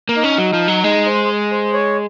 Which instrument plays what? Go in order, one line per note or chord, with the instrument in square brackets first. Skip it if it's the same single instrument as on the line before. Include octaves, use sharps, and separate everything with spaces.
[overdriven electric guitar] A#3
[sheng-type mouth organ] D#4
[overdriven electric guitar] C#4
F#3
F3
F#3
[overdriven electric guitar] G#3 [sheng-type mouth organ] D#4
[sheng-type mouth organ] C5
C5
C#5